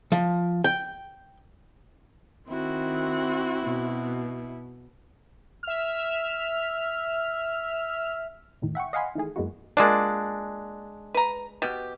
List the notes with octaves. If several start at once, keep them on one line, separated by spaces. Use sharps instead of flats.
F3
G5
D#3 C4 E4 F#4
B2
E5 F6
E2 A2 D#3
E5 F#5 G5 C#6
D#5 F5 F#5 G#5 B5 C6
D#3 E3 A3 G#4
F#2 G#3 A#3 B3 E4 F#4
G#3 A#3 D4 F4 D5
B4 A#5
B2 G4